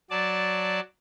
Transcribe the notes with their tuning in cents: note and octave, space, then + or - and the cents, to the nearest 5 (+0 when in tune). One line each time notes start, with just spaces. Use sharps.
F#3 +0 D5 +0 A5 -5